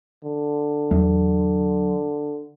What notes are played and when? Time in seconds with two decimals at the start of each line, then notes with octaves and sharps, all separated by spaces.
0.24 D3
0.91 E2 F#3